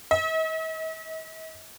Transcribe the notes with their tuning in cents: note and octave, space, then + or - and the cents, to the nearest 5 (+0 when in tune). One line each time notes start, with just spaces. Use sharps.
D#5 +45